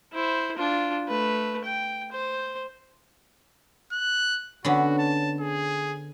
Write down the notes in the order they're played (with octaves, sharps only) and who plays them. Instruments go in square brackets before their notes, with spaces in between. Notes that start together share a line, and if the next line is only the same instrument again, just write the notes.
[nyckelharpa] E4 C5
D4 F4
A3 B4
G5
C5
[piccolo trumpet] F#6
[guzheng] D3 B3 C#4 [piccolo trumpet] F#4
[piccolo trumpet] A5
G#4